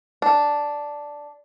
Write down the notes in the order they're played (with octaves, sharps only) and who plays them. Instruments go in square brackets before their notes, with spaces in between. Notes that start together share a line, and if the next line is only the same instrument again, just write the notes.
[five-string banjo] D4